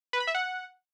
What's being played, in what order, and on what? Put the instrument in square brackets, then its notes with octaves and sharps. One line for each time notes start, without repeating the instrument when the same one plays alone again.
[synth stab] B4
B5
E5
F#5